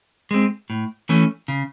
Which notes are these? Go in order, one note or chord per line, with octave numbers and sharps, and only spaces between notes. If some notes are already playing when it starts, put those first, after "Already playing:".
G#3 C4
A2
E3 A3 C#4
C#3